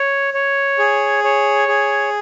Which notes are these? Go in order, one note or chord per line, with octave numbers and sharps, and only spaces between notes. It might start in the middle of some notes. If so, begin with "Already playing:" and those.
Already playing: C#5
C#5
G#4
C#5
G#4